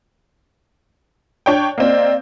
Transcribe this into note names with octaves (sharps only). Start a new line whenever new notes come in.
D4 C#5 G5
A#3 C4 D5 D#5 F5